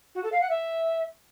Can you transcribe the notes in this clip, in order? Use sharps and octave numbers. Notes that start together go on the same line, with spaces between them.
F#4
A4
F5
F#5
E5